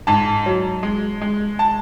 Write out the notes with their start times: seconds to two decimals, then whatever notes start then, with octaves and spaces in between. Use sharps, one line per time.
0.07 G#2 A5
0.46 F#3
0.83 G#3
1.21 G#3
1.59 A5